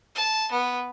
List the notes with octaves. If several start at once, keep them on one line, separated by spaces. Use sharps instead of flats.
A5
B3